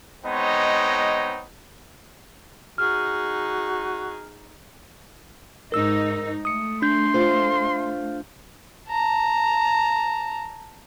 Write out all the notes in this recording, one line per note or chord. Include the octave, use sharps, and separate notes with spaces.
G#3 B3 C4 D#4 C#5 D#5
D#4 F#4 G#4 F6
G#2 D#4 A#4 E6
A3 D#6 C#7
D4 C6 G6
F4 C5
A5 A#5